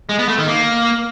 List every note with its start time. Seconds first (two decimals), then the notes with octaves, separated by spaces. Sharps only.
0.09 G#3
0.19 B3
0.28 A3
0.38 D#3
0.48 A#3